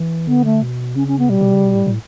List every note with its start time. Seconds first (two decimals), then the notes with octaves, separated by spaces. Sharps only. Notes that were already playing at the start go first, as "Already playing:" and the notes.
Already playing: E3
0.27 D3 B3
0.45 A3
0.62 B2
0.95 C#3 C#4
1.08 C#4
1.19 B3
1.29 B2 G3
1.41 B2
1.53 C#3
1.64 B2
1.75 A2
1.87 A2